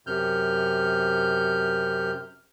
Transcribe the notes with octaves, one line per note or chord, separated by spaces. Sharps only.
F#2 C3 F6 G6